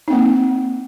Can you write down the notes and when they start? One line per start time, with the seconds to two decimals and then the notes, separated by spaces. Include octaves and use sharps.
0.08 D#4
0.10 C4
0.13 A#3